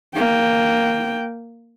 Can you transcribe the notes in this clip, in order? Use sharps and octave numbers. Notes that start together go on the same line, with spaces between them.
A#3 G5